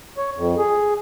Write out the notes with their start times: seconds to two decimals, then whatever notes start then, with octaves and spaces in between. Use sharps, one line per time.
0.18 C#5
0.36 F2
0.58 G#4